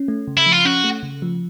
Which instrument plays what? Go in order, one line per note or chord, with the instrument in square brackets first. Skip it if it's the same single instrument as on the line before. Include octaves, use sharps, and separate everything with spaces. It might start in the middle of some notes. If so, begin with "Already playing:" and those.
Already playing: [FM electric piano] C#4
A3
C#3
[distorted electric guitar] E4
[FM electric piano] F3
[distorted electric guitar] F4
[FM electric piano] C#4 [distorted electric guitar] F#4
[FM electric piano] A3
C#3
F3